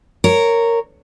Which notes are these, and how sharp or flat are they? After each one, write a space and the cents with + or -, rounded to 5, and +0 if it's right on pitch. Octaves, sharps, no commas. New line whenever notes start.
A#4 -10 C#5 +0